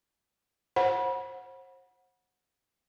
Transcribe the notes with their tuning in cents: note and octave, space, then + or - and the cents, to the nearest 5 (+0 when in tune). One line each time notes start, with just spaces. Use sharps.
C5 +35 F#5 -15 B5 -30